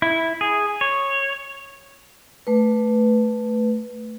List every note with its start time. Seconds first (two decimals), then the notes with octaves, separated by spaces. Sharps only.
0.02 E4
0.41 G#4
0.81 C#5
2.47 A3 B4